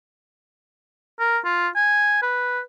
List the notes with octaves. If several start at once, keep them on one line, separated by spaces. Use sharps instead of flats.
A#4
F4
G#5
B4